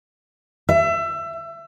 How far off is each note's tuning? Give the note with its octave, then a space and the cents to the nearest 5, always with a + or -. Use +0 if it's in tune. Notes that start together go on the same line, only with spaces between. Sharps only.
E5 +25